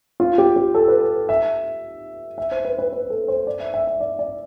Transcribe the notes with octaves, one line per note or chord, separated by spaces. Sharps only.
F4
G4
G4
A4
B4
E5
E5
C5
B4
B4
B4
A4
C5
D5
E5
E5
E5
D5
D5